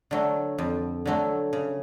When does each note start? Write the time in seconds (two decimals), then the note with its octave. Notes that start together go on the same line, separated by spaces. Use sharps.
0.11 D3 F#3 A3
0.58 F2
1.06 D3 F#3 A3
1.53 C#3